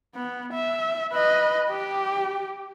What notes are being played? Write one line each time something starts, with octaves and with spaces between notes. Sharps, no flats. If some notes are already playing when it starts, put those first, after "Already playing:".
B3
E5
B4 D#5
G4